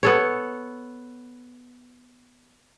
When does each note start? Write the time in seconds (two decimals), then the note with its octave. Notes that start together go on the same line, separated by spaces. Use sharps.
0.03 B3 A4 C#5